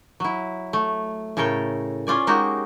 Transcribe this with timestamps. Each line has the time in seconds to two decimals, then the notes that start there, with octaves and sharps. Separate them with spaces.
0.20 F#3 E4
0.73 A3
1.37 A2 C#3 A4 A#4 G5
2.07 C#4 F4 D5 G#5
2.27 G#3 A#3 D#4 F#4 G4